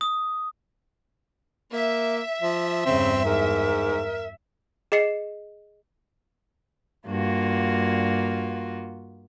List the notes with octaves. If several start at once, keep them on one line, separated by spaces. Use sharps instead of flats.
D#6
A#3 E5
F3
E2 G2 C#3 C4
G#2 A#4
G#4 D#5 C7 C#7
G2 A#3 F4 F#4